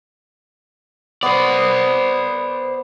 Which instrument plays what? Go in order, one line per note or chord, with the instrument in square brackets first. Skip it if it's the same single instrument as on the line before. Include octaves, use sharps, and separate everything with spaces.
[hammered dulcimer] B3 [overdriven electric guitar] C5 D5